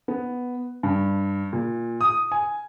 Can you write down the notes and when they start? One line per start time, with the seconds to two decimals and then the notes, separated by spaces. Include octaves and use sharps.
0.08 B3
0.83 G2
1.53 A#2
2.01 D#6
2.32 G#5